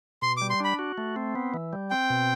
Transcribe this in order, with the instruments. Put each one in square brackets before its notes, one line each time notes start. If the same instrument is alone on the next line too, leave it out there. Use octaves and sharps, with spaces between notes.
[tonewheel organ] B2 [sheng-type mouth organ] C6
[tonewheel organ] G3 [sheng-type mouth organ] D6
[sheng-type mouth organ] C6
[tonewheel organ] D4 [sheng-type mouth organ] B5
[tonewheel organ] F#4
A3
C4
B3
E3
G3
[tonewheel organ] C4 [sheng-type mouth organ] G5
[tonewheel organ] B2